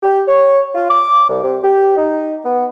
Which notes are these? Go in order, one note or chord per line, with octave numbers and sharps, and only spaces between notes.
G4
C#5
F4
D6
C2
C3
G4
D#4
B3